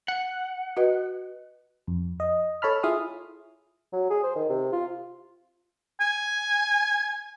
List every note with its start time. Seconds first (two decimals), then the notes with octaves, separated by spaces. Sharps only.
0.08 F#5
0.77 F#4 B4 D#5
1.87 F2
2.20 D#5
2.62 A4 C#5 A5 B5 F6
2.83 E4 F4 G#4 F5 D#6
3.93 F#3
4.10 G#4
4.23 C5
4.36 D#3
4.50 C3
4.73 F4
6.01 G#5